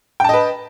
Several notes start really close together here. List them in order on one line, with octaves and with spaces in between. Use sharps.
G5 A5 D#5 B4